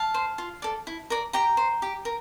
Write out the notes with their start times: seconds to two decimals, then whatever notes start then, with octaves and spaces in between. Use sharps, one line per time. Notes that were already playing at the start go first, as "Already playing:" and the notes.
Already playing: F5 A5
0.14 C5
0.38 F4
0.62 A4 D5
0.87 E4
1.10 A#4 D5
1.33 G4 G5 A#5
1.57 C5
1.82 G4
2.05 A#4